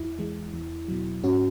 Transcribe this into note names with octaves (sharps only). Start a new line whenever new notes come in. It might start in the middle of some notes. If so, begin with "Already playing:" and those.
Already playing: E2 E4
E3 G#3
E2
B2 F#3
G#2 C#4 F#4